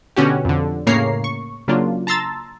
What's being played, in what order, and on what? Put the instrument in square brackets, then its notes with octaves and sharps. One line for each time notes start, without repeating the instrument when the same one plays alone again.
[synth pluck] B2 D3 C#4 F#4 G4
F2 D3
A2 C#3 A#3 C#5 A#5 C7
C#6
C#3 F#3 A#3 D4 F4
A5 A#5 C6 E6 A6